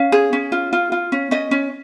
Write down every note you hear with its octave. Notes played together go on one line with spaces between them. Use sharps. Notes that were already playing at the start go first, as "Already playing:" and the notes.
Already playing: C#4 F5
G#4
C#4
F4
F4
F4
C#4
C#4 D#5
C#4